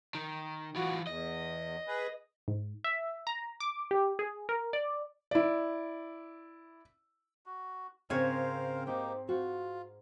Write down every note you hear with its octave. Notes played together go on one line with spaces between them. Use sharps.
D#3
E3 F4 F#4
E2 D#5
G#4 B4
G#2
E5
A#5
D6
G4
G#4
A#4
D5
E4 D5
F#4
G#2 C#3 C4 A#4 C5 C#5 F5
A#3 D#4 G4 G5
F4 F#4